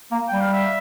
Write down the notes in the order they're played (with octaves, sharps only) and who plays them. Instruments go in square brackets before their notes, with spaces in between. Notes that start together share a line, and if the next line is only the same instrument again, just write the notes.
[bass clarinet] A#3
[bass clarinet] G3 [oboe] G5
[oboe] F5
E5